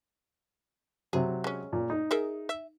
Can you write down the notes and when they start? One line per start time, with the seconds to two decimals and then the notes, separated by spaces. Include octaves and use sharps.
1.13 C3 F#3 G#4
1.44 G#3 C#4
1.73 A#2
1.90 D#4
2.11 G#4 A#4 E5
2.49 E5